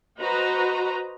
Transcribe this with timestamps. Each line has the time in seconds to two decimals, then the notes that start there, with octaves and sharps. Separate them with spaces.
0.20 F#4 B4 C5 D#5 A#5